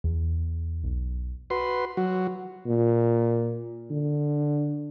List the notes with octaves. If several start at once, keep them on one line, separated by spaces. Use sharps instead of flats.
E2
B1
F#4 B4 C6
F#3 F#4
A#2
D3